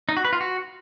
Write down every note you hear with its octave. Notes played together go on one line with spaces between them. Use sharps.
D#4
F#4
B4
F4
F#4